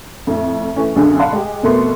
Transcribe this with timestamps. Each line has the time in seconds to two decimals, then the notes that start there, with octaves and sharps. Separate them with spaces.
0.27 F2 A2
0.76 E3 A3 C#4
0.96 B1 F#2 D3 D4 G#4
1.19 D5 F5 F#5 A5 B5 C6
1.33 G#3 G4
1.63 F2 B2 A3 B3 A#4 C6